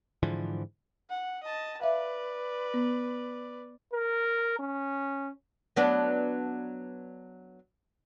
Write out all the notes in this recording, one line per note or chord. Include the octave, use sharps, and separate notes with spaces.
G#2 D3 E3 F3
F#5
D#5 A5
B4 D5 E5 F5
B3
A#4
C#4
F#3 B3 D4